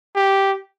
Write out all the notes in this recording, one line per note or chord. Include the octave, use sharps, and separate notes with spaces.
G4